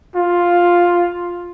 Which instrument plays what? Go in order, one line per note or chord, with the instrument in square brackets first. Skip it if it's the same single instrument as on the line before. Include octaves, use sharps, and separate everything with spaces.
[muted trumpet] F4